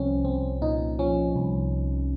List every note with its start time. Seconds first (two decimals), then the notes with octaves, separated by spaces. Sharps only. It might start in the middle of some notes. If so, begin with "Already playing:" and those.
Already playing: C2 F3 C4 C#4
0.25 C2 C4
0.62 A#2 D#4
0.99 F3 C#4
1.36 C2